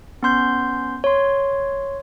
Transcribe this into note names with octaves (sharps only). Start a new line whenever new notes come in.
B3 C#4 C6 G6
C#5 C6